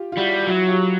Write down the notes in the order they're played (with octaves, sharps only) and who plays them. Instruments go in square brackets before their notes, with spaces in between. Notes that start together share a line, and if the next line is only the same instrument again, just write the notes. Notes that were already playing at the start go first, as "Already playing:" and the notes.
Already playing: [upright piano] F4 G4
F4
[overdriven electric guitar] G3 [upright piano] E4 F#4
[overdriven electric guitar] F#3 [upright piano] E4 F#4
[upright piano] F4 G4